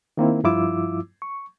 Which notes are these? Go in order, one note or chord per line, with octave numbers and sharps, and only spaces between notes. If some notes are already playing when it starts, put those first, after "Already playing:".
D#3 A#3 C4 E4
G2 F3 E4 F4 D6 E6
C#6